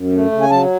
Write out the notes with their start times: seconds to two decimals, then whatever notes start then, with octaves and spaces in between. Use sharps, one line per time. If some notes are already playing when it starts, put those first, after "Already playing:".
Already playing: F#2
0.13 A3
0.32 C#3
0.41 G#5
0.50 F#3 A5